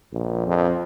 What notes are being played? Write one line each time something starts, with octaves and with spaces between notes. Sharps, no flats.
A#1
F2